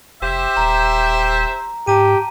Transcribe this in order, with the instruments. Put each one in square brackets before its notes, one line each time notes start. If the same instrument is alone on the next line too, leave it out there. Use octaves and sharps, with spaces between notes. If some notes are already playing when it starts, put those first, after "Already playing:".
[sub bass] F1 [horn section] G4 C5 E5
[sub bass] D#1 [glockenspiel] A#5
[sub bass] G#2 [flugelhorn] G4 [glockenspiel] A5 A#5 D#7